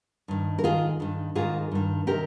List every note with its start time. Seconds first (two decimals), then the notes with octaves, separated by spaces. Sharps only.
0.28 G2 D#3
0.59 A#4
0.64 G#2 D#3 F4 G#4
1.00 G2 D#3
1.35 G#2 D#3 F4 G#4
1.72 G2 D#3
2.07 C3 D#3 G4 A#4